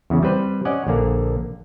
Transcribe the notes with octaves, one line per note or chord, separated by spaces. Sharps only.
E2 C#3
G3 C4 B4 C5
C#4 D5 D#5 F#5
A#1 D3 A#3